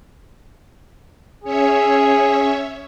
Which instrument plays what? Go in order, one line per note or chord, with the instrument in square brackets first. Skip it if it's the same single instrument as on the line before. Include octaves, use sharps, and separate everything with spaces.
[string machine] C#4 C#5 E5 [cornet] G#4